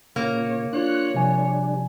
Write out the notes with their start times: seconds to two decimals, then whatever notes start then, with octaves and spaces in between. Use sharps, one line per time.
0.16 A#2 C#3 A#3 C#5
0.73 D4 F4 C#5 F#6
1.14 C3 F3 G3 D4 G#5